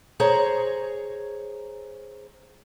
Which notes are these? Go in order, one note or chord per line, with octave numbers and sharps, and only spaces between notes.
G#4 C5 C#5 A#5